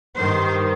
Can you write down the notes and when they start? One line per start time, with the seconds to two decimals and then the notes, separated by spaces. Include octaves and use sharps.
0.16 G2 D#3 C5